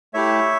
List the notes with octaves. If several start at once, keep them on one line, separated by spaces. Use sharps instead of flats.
A3 E4 G4 C#5 E5